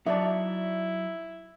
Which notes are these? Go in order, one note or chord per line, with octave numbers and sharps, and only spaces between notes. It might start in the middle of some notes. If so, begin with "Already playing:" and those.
F#3 D#4 E4 D5 E5 A5